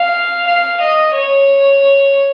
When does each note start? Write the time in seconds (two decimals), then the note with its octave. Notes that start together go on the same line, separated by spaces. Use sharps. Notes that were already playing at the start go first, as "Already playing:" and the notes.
Already playing: F5
0.47 F5
0.81 D#5
1.14 C#5